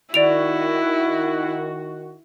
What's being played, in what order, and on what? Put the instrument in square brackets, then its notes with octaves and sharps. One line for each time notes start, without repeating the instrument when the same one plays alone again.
[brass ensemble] D#3 F#4 [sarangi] E4 [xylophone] D5 D7 F7